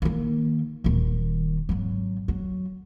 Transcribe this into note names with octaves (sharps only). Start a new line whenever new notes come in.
D#3 A#3
D#1 D#3
G#1 F#3
F#3